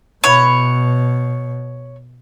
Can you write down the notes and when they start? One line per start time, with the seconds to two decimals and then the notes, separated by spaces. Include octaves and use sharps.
0.24 B2 B3 E4 B4 C#5